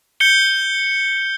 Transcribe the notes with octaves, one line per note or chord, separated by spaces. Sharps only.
G6 C#7 G7